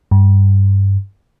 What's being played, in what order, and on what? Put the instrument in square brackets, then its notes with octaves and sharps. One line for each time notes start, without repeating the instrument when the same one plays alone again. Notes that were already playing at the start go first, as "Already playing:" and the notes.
[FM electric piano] G2